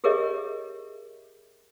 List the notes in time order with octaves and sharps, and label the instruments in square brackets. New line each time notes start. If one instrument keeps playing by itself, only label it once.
[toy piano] G4 G#4 A#4 C#5 D#5 E5